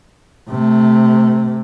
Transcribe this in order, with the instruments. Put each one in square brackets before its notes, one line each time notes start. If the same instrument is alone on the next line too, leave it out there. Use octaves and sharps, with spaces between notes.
[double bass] C3 A3